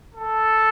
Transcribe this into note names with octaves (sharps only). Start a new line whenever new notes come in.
A4